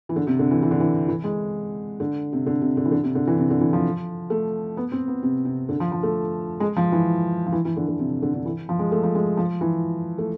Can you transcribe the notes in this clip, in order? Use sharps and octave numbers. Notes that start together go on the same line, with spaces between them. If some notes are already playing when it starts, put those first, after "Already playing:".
E3
D3
C3
D3
E3
E3
D3
E3
E3
G#3
D3
C3
D3
C3
D3
E3
D3
C3
D3
E3
C3
D3
E3
F3
A3
B3
C4
B3
C3
C3
D3
F3
F3
A3
G#3
F3
E3
F3
E3
E3
D3
D3
C3
D3
D3
E3
F3
G#3
A3
F3
G#3
F3
E3
A3